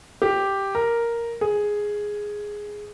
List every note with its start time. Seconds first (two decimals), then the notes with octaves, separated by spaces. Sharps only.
0.22 G4
0.75 A#4
1.41 G#4